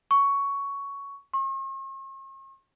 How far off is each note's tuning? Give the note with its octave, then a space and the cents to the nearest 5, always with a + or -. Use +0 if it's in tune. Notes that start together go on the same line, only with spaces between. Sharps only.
C#6 +10
C#6 -45